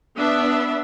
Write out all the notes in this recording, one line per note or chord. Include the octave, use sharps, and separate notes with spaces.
B3 D4 E5